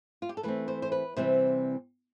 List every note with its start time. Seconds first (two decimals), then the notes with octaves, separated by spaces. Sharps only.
0.22 F4
0.29 G4
0.37 A4
0.43 E3 A3 C4 B4
0.68 C5
0.82 C5
0.92 B4
1.16 C3 E3 G3 C4 C5